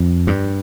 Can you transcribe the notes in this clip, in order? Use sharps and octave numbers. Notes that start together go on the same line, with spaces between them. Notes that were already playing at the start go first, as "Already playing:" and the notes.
Already playing: F2
G2